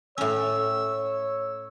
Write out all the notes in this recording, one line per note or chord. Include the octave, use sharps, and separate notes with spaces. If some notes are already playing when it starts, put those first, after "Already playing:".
A2 C#4 C#5 E6